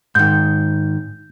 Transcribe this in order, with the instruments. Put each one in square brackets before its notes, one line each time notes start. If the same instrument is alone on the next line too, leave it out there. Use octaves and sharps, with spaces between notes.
[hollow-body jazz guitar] G#2 D#3 [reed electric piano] G6